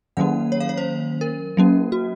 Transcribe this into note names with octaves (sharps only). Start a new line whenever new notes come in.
D#3 F#3 A#3 C#4 F#5
C#5
F5
C#5
C5
A#4
F#3 A#3 C#4
F#4